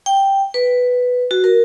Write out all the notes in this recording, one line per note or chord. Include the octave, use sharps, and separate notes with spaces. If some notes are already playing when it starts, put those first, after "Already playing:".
G5
B4
F#4
A#4